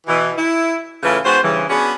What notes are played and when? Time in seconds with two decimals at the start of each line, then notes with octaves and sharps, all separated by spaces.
0.07 B2 E3
0.38 E4
1.03 A2 C#3 E3 A3 E4 F4
1.25 G#2 B3 F#4 C5
1.43 G2 C#3 E3
1.70 B3 C#4 D4 F#4 G#4